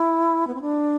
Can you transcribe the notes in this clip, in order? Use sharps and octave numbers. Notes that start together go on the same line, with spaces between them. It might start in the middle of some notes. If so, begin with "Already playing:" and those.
Already playing: E4
B3
C4
D4